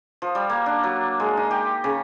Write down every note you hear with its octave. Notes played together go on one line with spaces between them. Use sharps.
F3
G3
A#3
D4
F#3
G#3
D#4
G4
C#3